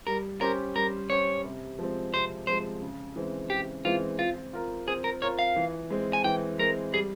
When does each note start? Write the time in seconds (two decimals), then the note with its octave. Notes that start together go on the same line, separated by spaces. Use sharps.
0.07 G3 A#4
0.41 C#4 G4 A#4 C5
0.75 G3 A#4
1.10 C#4 G4 C5 C#5
1.44 C3
1.79 F3 G#3 C4
2.13 C3 C5
2.47 F3 G#3 C4 C5
2.82 C#3
3.16 E3 G#3 C4
3.50 C#3 G4
3.85 E3 G#3 C4 F4
4.19 C4 F4
4.53 F4 A#4
4.87 C4 G#4
5.04 A#4
5.22 F4 A#4 C#5
5.39 F5
5.56 E3
5.90 G#3 C4
6.13 G#5
6.24 E3 G5
6.59 G#3 C4 A#4
6.93 G3 G#4